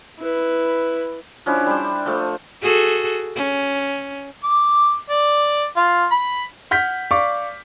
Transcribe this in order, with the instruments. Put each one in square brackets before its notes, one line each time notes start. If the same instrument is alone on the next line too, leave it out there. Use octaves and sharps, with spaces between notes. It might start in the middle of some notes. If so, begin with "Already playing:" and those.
[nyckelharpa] E4 B4
[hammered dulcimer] F3 C#4 D4 E4
G3 C5
F3 A3
[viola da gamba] F#4 G#4 A4
C#4
[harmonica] D6
D5
F4
B5
[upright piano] F#5 F6 G6 B6
D5 F5 C#6 D6